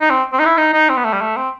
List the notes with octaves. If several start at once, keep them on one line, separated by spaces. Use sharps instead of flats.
D#4
C4
C4
D#4
E4
D#4
D#4
C4
B3
A3
G3
A3
C4